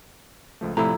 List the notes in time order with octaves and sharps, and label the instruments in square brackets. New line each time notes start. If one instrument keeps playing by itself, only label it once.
[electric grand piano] C#2 F3 A3
[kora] A2 E4 [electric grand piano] C3 [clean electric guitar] F3 A#5